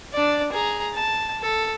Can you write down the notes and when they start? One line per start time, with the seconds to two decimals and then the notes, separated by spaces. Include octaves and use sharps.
0.13 D4 D5
0.52 G#4 A#5
0.94 A5
1.41 A4